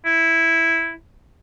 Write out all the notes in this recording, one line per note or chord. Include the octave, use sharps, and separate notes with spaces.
E4